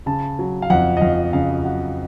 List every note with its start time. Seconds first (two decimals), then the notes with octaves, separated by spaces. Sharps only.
0.06 C#3 A5
0.39 F#3
0.62 F5
0.70 F2 F#5
0.97 D#5
1.01 F2 F5
1.33 C#3 F5
1.64 F#3 F#5